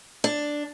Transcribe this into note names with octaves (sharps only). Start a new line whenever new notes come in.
D4